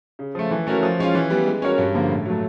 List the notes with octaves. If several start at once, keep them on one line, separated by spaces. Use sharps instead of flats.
C#3
F3 A3
E3
A3 C#4 F#4 A#4
F3
G#3 C#4 F4
E3
G3 B3
G#3
C#4 F#4 A#4 C#5
G2
D3 F3 A#3
A2
F#3 A3